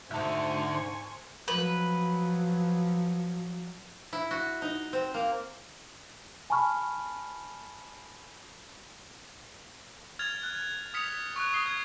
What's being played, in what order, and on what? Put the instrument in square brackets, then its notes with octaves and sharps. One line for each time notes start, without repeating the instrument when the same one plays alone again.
[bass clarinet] G#2 [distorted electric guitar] D3 E5 [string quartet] C5 G#5 C#6 [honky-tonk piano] A5 G6
[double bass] F3 F#3 [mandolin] B4
[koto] E4
F#4
D#4
C4
A#3
[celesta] G#5 A5 B5 C#6 F6
[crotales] F6 G#6 A6 F7
F#6
D#6 F6 B6 C#7 F7
C#6 F#6
D#6 C7 G7
G#6